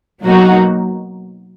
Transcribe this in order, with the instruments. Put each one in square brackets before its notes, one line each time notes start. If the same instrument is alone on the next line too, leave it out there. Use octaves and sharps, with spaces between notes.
[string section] B2 F#3 A#3 D#4 F#4